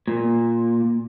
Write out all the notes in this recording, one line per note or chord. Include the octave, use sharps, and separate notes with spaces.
A#2